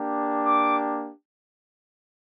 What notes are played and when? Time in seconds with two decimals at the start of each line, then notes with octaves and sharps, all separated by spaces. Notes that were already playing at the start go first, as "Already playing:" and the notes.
Already playing: A#3 D4 G4
0.46 D6